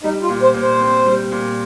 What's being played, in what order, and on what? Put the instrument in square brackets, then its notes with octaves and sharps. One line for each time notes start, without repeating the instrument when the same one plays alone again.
[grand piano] G3 [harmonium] D#4
[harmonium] F4
[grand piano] A#2
[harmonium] C5
[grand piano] A#2
[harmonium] C5
[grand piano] C4
G3
A#2